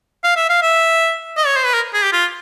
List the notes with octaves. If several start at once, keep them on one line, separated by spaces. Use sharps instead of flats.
F5
E5
F5
E5
D#5
C#5
C5
B4
A#4
G#4
G4
F4